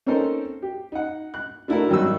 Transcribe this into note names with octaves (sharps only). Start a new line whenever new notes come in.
C4 C#4 D#4 A4 A#4 C5
G4
D#4 F#5
F#6
A3 D4 E4 F#4 A4 A#4
G#1 D#3 F#3 G3 E6